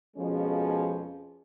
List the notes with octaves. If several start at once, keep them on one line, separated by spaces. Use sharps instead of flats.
F2 B2 F3 G#3 C#4 G#4